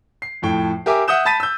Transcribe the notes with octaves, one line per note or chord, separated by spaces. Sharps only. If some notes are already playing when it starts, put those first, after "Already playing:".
C7
F2 A2 G5
G4 A#4 E5 G#5 D6
E5 F#5 D#6 G6 E7
A5 B5 A6 B6 D#7
E6 G6